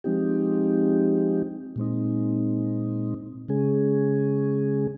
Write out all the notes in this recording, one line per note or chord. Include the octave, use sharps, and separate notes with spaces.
F3 G#3 C4 D#4 G4
A#2 G#3 C4 D#4
C#3 G#3 C#4 G#4